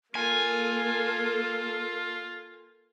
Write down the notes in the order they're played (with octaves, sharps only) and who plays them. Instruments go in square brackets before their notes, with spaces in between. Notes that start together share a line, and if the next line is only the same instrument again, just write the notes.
[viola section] A#3 A4 [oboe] F4 [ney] A#4 [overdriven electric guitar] G#5